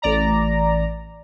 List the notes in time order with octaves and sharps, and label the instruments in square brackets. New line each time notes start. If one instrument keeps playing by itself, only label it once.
[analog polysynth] A1 D5 A#5